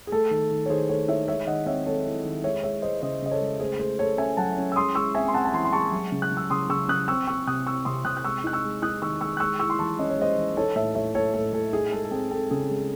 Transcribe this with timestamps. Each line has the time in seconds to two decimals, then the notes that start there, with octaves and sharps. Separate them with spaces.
0.07 G#4
0.12 A3 A4
0.31 D#3
0.51 D#3
0.66 C#5
0.70 D#3 G#4 C5
0.89 A3 A4 C#5
1.08 D#4 C#5 E5
1.28 G#3 C#5 E5
1.47 D#3 D#5 F#5
1.66 C4 C#5 E5
1.86 C4 A4 C#5
2.05 E4
2.25 D#3
2.44 G#3 C#5 E5
2.63 G#3 C#5 E5
2.82 G#3 C5 D#5
3.02 C#3 C5 D#5
3.22 C#3 D#5
3.31 A4 C#5
3.40 G#3
3.60 A3 G#4 C5
3.79 A3 G#4 C5
3.99 A3 A4 C#5
4.18 C#4 E5 G#5
4.37 F#3 F#5 A5
4.57 C#4
4.72 E6
4.76 G#3 C6 D#6
4.95 G#3 C#6 E6
5.15 C4 E5 G#5
5.28 C6
5.34 C4 F#5 A5
5.45 A5
5.54 E3 G#5 C6
5.65 C6
5.72 G#3 A5 C#6
5.92 F#3
6.12 C#3
6.22 F#6
6.32 C#3
6.37 E6
6.50 C#3 C6 D#6
6.69 C#3 C#6 E6
6.89 C#3 D#6 F#6
7.08 C4 C#6 E6
7.27 C4 C#6 E6
7.47 C3 D#6 F#6
7.66 C4 C#6 E6
7.85 C3 C6 D#6
8.05 C3 D#6 F#6
8.17 F#6
8.24 G#3 C#6 E6
8.44 D#4 F#6
8.53 C#6 E6
8.64 G#3
8.82 D#4 D#6 F#6
9.02 D#3 C#6 E6
9.21 G#3 C#6 E6
9.37 F#6
9.40 G#3 C#6 E6
9.60 E4 C#6 E6
9.70 C6
9.79 E3 A5 C#6
9.99 C#4 D#5
10.10 C#5
10.18 G#3 C5 D#5
10.37 E3
10.57 D#4 A4 C#5
10.76 A2 C#5 E5
10.95 A2 C#5 E5
11.15 A2 A4 C#5
11.34 A2 A4
11.53 A2 A4
11.73 D#4 G#4
11.92 G#3 A4
12.05 A4
12.11 C4 G#4
12.31 C4 A4
12.51 C#3 G#4
12.69 G#3